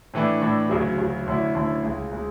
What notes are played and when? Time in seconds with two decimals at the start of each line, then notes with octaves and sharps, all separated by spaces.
0.14 A2 E3 A3 D4
0.42 A2 E3 A3 D4
0.70 D2 C#3 F#3
0.98 D2 C#3 F#3
1.26 D2 D3 A3 C#4 E4
1.55 D2 D3 A3 C#4 E4
1.83 C#2 C#3 G#3
2.12 C#3 G#3